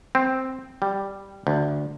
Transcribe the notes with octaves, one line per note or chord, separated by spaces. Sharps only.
C4
G3
D2